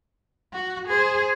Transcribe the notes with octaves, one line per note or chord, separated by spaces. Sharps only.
F#4
G#4 C5